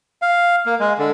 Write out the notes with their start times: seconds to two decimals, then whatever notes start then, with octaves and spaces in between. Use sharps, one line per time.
0.22 F5
0.66 A#3
0.80 G#3
0.98 D3